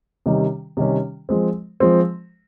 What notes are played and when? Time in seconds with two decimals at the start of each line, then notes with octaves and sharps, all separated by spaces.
0.26 C3 D#3 G3 C#4
0.77 C3 D#3 G3 C#4
1.29 F3 G#3 C4
1.80 F3 G#3 C4